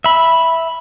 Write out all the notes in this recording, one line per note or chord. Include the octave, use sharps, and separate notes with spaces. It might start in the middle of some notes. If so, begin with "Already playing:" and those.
E5 B5